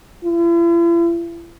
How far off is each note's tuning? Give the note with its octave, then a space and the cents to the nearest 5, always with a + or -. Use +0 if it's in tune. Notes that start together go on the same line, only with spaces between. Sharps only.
E4 +45